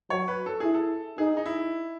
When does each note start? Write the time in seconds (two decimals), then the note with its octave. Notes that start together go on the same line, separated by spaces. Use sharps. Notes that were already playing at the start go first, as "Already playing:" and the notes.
0.10 F#3 C#5
0.28 B4
0.46 A4
0.60 E4 G#4
0.74 A4
1.18 D#4 G#4
1.37 D#4
1.46 E4